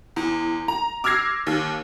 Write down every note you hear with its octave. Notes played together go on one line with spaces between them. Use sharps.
E2
A#5
D6 E6 F6 G#6 A#6 C7
D#2